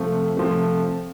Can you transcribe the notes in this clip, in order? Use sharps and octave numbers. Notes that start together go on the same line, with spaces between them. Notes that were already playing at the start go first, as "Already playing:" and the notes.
Already playing: C3 F3 A3
C3 F3 A3